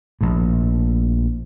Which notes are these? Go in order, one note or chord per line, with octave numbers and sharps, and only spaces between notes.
A#1 A2